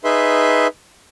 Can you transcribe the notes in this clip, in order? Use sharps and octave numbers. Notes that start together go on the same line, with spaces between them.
D#4 G#4 B4 E5 C6